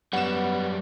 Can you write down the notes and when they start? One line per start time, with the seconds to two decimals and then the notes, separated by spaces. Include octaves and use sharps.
0.13 F#2 G3 B3 F#5 E7